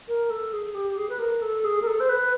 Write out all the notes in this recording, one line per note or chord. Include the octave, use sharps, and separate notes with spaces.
A#4
A4
G#4
G4
G#4
B4
A#4
A4
G#4
A#4
A4
C5
B4